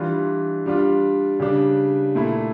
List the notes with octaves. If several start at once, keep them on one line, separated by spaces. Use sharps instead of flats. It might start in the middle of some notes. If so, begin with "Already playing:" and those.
Already playing: E3 G3 D4 F4
G3 D4 F4
C#3 G3 D4
A#2 A3 E4